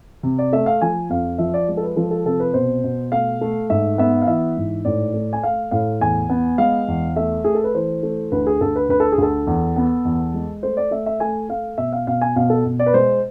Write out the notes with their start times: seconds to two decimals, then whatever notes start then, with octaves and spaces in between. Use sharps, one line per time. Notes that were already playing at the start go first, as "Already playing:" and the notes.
0.23 C3
0.39 D5
0.53 A3 E5
0.66 F5
0.81 F3 G#5
1.10 F2 F5
1.38 F3 E5
1.54 D5
1.68 G#3
1.77 A4
1.83 B4
1.96 F3 A4
2.11 A4
2.25 C3 A4
2.40 B4
2.54 B2 C5
2.84 B2
3.12 A3 F5
3.41 A3
3.70 G#2 E5
3.98 B3 E5
4.22 F5
4.27 E3 E5
4.57 G#2
4.85 A2 D5
5.14 A3
5.33 G#5
5.43 A3 F5
5.71 A2 F5
6.00 E2 G#5
6.29 B3
6.58 G#3 F5
6.88 E2
7.16 A3 E5
7.44 A3 G#4
7.55 A4
7.64 B4
7.75 E3 C5
8.03 A3
8.32 D2 B4
8.47 G#4
8.61 D2 A4
8.76 B4
8.89 D2 B4
9.00 A4
9.12 G#4
9.18 D2 A4
9.47 E2
9.76 B3
10.05 E2
10.34 G#3
10.63 A3 C5
10.77 D5
10.91 A3 E5
11.06 E5
11.20 A3 G#5
11.49 A3 F5
11.78 B2 E5
11.92 F5
12.07 B2 F5
12.21 G#5
12.36 B2 F5
12.50 A4
12.65 B2
12.79 D5
12.86 B4
12.94 G#3 C5